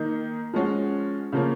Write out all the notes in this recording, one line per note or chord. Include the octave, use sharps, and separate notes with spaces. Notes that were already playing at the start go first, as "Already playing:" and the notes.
Already playing: D#3 A#3 D#4
F3 G#3 C#4 F#4
C#3 F3 A#3 C#4